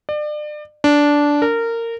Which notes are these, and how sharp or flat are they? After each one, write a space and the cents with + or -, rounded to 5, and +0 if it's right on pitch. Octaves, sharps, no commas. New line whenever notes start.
D5 +35
D4 -10
A#4 -20